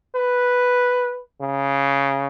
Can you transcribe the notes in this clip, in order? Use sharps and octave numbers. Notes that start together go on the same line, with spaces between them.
B4
C#3